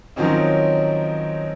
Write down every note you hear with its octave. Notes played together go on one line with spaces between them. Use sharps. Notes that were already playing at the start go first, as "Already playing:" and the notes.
D#3 F3 F#3 C4 C#4 D#4